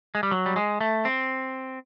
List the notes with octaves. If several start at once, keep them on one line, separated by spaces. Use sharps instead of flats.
G#3
G3
F#3
G3
G#3
A3
C4